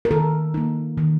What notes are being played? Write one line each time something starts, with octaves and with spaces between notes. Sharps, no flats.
A#4
D#3 A4
A#3 D#4
D#3